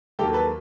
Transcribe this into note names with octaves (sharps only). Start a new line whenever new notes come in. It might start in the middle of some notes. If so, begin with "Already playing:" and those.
D#2 D#3 F#3 A#3 G4 A4
A4 B4